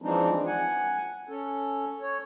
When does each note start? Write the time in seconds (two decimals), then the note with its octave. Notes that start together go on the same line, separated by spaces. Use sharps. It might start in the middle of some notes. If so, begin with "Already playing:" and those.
0.02 E3 F3 G#3 C4 D4 D#4
0.47 F#5 G#5
1.29 C#4 A4
2.02 C#5